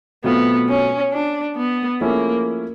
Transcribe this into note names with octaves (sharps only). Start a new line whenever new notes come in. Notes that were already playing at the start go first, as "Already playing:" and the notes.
B2 F#3 A3 B3 C4 F4
C#4
D4
B3
F3 A3 A#3 C#4 E4 G#4